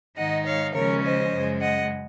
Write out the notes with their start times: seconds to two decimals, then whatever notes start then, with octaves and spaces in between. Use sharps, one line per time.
0.16 G#2 D#3 G#3 D#4 D#5 F#5
0.46 C#5 F5
0.74 D#2 C#3 F3 G#3 C#4 A#4 C#5
1.03 C5 D#5
1.31 F#2 C#3 G#3
1.60 D#5 F#5